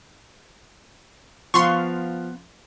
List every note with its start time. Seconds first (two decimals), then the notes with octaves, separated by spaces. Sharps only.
1.54 F3 B3 F5 C6 C#6